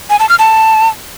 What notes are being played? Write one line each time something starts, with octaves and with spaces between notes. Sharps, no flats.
G#5
A5
F6
A5